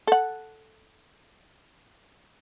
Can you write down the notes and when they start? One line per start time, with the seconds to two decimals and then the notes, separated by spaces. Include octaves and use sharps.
0.07 A4 F#5